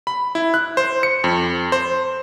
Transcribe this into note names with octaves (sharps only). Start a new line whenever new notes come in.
B5
E4
F#6
C5
C#7
F2
C5